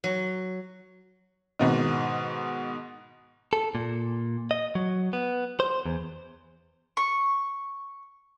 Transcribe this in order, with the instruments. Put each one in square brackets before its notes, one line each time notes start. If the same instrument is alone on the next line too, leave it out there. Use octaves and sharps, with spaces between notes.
[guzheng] F#3
[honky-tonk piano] G#2 B2 D#3
[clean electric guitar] A4
A#2
D#5
F#3
B3
C5
E2
[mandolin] C#6